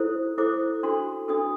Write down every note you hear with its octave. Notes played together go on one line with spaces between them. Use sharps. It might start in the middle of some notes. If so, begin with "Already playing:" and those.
Already playing: E4 A4 C5
E4 A4 C5 D6
D4 F#4 A4 C6
D4 F#4 A4 D#6